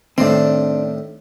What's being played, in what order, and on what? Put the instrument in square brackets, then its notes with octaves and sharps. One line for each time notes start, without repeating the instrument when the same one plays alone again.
[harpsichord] A2 D#3 [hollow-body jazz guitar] C4 D4